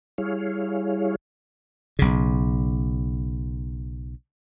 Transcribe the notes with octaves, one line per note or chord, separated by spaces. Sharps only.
G3 E4 G#4 C#5 F5
B1 C#3